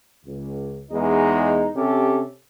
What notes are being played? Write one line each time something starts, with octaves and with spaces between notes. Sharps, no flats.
C#2
E2 G#3 D#4
C3 C#4 G4 A4